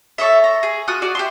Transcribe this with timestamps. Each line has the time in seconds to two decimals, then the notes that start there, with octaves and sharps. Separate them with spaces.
0.18 A4 C#5 D#5 E5
0.44 A#5
0.63 G#4
0.88 F4 F#4 D#6 F#6
1.02 F#4 D5
1.15 G4 E5 C6